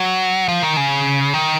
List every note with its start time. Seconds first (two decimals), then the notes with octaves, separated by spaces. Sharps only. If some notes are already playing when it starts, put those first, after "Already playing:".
Already playing: F#3
0.48 F3
0.63 D#3
0.77 C#3
1.34 D#3